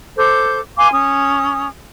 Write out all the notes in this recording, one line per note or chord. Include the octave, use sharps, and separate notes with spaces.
A4 C5 D6 G6
F5 G#5 C6 D6
C#4 D#6